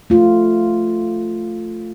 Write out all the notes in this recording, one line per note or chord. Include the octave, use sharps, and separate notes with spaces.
A3 F4